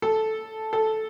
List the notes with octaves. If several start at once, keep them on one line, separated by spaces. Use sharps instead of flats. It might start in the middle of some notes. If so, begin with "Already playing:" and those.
A4
A4